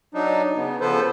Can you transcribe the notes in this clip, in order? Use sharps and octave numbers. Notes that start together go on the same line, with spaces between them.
F#3 D4 D#4
C#3 B3
C#3 F3 B3 A4 B4 C5